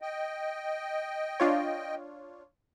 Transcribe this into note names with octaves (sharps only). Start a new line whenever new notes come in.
D#5 G5
D4 F4 C#5